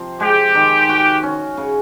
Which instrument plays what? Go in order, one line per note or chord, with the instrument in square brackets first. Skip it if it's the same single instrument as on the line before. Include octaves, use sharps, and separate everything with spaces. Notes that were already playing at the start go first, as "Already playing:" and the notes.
Already playing: [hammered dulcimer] C3 F3 C4
[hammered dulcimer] G#3 [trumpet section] G4
[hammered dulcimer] D#3
F#4
C#4
C#3